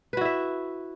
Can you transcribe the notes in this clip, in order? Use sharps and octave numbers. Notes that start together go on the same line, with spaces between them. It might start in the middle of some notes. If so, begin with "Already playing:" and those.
E4 F#4 B4 E5